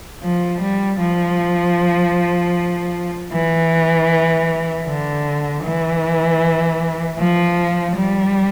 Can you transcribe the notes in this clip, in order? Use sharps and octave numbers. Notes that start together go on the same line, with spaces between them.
F3
G3
F3
E3
D3
E3
F3
G3